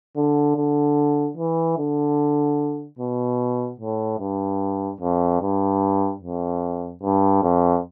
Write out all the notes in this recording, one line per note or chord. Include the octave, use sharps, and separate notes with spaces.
D3
D3
E3
D3
B2
A2
G2
F2
G2
F2
G2
F2